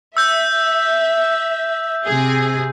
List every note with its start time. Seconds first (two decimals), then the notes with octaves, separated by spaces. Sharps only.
0.17 E5 E6 G6
2.05 C3 G#4